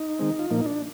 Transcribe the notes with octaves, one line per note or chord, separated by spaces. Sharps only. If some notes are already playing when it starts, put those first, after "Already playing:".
Already playing: D#4
D#3 G#3 C4
F4
A#2 F3 A#3 D#4
D#4
D4